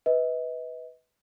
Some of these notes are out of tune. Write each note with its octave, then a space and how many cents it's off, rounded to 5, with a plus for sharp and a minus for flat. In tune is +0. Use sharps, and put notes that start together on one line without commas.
B4 +0 D#5 +35